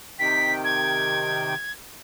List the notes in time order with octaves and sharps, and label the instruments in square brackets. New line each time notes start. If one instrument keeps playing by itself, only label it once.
[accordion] C3 D#3 G5 [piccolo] B6
[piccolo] G#6